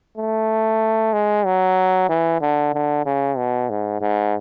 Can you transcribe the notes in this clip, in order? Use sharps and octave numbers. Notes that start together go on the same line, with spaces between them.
A3
G#3
F#3
E3
D3
D3
C#3
B2
G#2
G#2